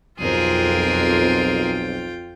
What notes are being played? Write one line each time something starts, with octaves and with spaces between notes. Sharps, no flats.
B1 F2 F4 G#4 A#4 G5